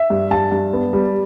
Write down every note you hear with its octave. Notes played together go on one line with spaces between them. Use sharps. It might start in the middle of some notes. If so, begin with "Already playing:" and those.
Already playing: E5
G2
G2 A5
G2
B3
G3